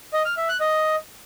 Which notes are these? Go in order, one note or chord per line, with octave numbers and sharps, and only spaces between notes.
D#5
F6
E5
F#6
D#5